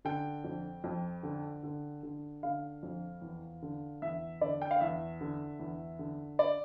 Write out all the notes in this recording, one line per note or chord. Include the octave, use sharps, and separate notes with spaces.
D3 G5
F2
F2
D3
D3
D3
D3 F5
F2
E2
D3
E2 E5
D3 D5
G5
F5
E2 E5
D3
E2
D3
D5